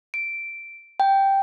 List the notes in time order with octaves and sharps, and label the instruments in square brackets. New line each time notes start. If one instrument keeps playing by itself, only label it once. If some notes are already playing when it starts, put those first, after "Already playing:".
[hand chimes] D7
G5